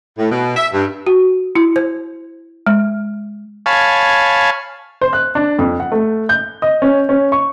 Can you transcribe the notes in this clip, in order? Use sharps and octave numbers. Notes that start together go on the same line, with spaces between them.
A2
B2
E5
G2
F#4
E4
C5
G#3
C#5 F5 G#5 A5 B5
C5
F#6
D4
F2
F#5
A3
G6
D#5
C#4
C#4
C#6